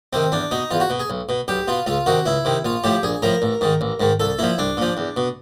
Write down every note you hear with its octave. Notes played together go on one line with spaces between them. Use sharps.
C3 D#3 C4
E2 D4
B2 D#4
E2 F4
F#4
B2
G#4
B1
B2
B1 G4
B2 F4
C#2 F4
C3 D#3 F#4
C#2 E4
C3 D#3
A#1 F4
A2 F3 G4
A#1 G#4
A2 F3 A#4
A1
G#2 D#3
A1
G#2 D#3
C2 A4
A#2 F3 E4
C2 D4
A#2 F3
E2
B2